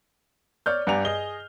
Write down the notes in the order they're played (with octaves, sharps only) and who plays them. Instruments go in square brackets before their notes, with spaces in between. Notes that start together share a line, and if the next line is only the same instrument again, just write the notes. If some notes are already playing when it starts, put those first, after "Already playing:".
[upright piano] C#5 D5 F6 G6
G2 D5 F#5 G#5 A#5 F7
G#4 D#5 G7